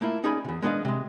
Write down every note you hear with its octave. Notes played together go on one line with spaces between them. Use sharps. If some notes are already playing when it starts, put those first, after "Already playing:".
A3 A#3 E4 F4
C#4 D#4 G#4 D5 G#5 B5
E2 C3
G#3 B3 D4 G#4 D#5 F5
C3 G#3